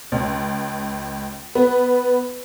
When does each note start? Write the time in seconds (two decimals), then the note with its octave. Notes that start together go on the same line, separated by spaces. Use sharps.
0.12 C#2
1.55 B3